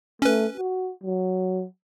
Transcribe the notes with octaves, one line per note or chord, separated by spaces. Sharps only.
A3 C#4 B4
F#4
F#3